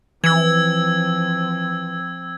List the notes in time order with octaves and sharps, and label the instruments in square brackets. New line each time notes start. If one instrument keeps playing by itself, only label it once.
[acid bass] E3 [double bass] F3 C4 [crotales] E6 G#6